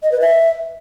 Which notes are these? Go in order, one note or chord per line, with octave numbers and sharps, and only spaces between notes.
D#5
B4
E5